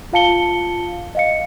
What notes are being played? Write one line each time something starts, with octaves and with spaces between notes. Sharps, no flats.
F4 F5 A5 C#7 G7
D#5 F5 C#7